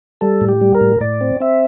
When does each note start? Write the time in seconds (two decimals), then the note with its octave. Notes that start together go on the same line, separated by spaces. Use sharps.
0.21 G3 A4
0.41 A2
0.48 G4
0.61 G3
0.75 A#4
0.81 A2
1.00 A2 D5
1.21 C4
1.40 C4 E5